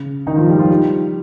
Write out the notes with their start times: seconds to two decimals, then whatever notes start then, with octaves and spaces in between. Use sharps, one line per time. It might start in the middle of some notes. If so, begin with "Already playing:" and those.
Already playing: C#3
0.27 D#3 D#4
0.37 F3 F4
0.48 G3 G4
0.59 F3 F4
0.70 G3 G4